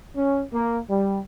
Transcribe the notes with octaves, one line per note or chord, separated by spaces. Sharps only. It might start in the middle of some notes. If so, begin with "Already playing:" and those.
C#4
A#3
G3